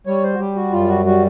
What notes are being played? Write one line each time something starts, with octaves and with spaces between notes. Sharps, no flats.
G3 C#5
C5
F#4
G3 G4
F#4
F#2 F4
F#4
G3 F#4